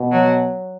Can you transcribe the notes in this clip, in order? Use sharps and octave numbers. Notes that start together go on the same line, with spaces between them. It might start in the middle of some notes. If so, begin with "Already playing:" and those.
Already playing: B2
F#3